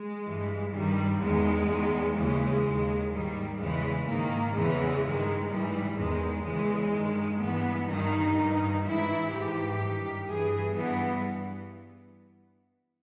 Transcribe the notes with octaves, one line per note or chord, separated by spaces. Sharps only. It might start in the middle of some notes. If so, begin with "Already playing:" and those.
Already playing: G#3
G2 E3
G2 D#3 G3
E2 D#3 G#3
E2 D#3
D#2 C#3 E3 G#3
D#2 D#3
G#2 D#3 G3
E2 C#3 E3 G#3
G#2 D#3 A#3
E2 C#3 E3 G#3
G2 D#3
G#2 E3 G3
E2 D#3 G#3
E2 C#3 E3 G#3
G2 D#3
G2 E3 B3
G2 D#3 D#4
G2 D#3
G#2 E3 E4
G#2 E3 G4
G2 D#3
G2 E3 G#4
G2 E3 B3